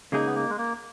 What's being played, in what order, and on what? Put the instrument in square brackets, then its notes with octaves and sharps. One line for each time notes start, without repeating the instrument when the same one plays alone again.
[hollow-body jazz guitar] C#3 G#3 D#4 G#4 [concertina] A#3
[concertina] B3
A#3
G#3
A#3